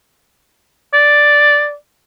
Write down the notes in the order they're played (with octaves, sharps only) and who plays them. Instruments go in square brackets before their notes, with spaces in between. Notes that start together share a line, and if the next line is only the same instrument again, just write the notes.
[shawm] D5